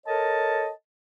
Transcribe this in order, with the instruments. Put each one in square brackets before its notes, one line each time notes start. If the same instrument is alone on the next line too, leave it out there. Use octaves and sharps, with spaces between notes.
[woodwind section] A4 A#4 C#5 D#5 A5